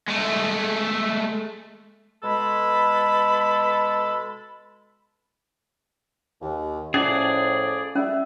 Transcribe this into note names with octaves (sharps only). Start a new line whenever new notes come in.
G#3 A3
B2 G#3 A4 B5
D#2
A2 F3 C#4 G#4 D5
G3 C#4 E5